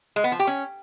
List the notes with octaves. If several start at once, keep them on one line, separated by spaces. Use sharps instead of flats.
G#3
B3
F3
G4
C#4